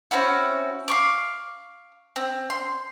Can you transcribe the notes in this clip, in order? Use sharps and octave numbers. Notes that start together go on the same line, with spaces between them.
C4 C#4 E4 F#4
F5 C#6 D6
C4
C6